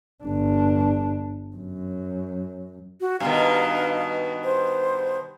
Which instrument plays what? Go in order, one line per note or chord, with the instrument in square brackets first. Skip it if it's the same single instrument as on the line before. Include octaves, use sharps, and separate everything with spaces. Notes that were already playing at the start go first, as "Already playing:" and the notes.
[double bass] G1 D4
F#2
[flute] F#4
[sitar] G2 B2 D#3 [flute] F5
[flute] C5